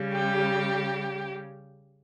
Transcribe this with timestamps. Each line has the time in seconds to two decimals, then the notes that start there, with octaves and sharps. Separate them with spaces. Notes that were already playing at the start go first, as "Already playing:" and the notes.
Already playing: C#3 G3
0.13 G4